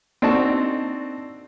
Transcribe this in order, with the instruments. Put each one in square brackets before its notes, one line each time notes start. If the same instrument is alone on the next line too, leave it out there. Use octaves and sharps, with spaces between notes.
[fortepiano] C4 D4 D#4 F#4 A4 A5